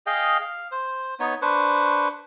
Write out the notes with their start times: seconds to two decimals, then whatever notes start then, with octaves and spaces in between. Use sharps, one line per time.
0.07 G#4 D#5 F5 G5
0.41 F5
0.71 C5
1.20 B3 D#4 C#5
1.42 D4 B4 C5 C#6